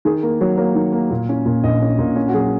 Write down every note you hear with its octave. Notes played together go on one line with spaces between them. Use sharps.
D#3 G#4
A#3 A#4
F#3 C#5
A#3 C#5
D#3
A#3
A#2
C#4
A#2
A#1 D#5
C#4
A#2
C#4
F#4
F#3 G#4